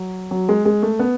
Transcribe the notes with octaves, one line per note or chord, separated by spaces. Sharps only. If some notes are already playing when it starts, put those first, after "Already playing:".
Already playing: F#3
F#3
G#3
G#3
A3
B3